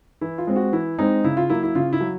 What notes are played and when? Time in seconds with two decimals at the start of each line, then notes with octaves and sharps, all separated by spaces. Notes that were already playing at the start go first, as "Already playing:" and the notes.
0.21 E3 E4
0.38 F4
0.47 G#3 C4
0.56 F#4
0.73 E3 E4
0.99 G#3 C4 D#4
1.24 C#3 E4
1.37 F4
1.50 F#3 A#3 E4
1.63 E4
1.75 C#3 F4
1.93 E4
2.01 F#3